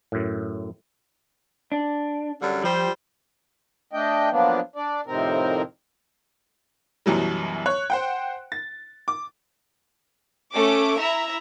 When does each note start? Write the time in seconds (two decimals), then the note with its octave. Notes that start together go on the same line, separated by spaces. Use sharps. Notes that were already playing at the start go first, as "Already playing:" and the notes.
0.12 F#2 A2
1.72 D4
2.41 F#2 D3 G3
2.64 F3 G3 G4 C5
3.93 A3 D4 D#5 G5
4.30 F3 F#3 A#3 B3 D4
4.76 D4 D5
5.06 F2 A2 C3 D#3 C4 A#4
7.06 F#2 B2 E3 F#3 G3
7.66 C#5 F#6
7.90 C5 F#5 G5
8.52 A6
9.08 D6
10.52 A3 C#4 D6
10.99 E4 E5 A#5